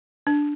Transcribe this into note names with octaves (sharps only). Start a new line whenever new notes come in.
D4